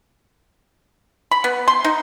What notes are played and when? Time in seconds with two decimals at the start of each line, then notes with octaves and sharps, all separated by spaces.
1.31 B5
1.44 B3
1.68 C6
1.85 D#4